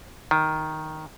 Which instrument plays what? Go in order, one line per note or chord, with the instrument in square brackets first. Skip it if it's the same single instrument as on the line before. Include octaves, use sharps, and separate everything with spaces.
[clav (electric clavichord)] D#3